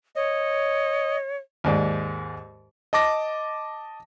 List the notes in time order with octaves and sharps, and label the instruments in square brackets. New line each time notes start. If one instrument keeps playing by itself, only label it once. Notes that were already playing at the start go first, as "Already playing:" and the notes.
[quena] C#5 [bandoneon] D#5
[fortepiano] D#2 G#2 D5
[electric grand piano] D#5 A5 D6 A#6